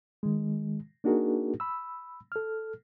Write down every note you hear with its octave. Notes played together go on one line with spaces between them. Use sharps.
D#3 G#3
A#3 D4 D#4 F#4 G#4 A#4
B5 E6
A4 F6